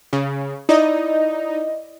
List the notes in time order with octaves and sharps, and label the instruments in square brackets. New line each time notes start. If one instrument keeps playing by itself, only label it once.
[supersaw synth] C#3
[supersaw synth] D#4 [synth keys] E4 D5 D#5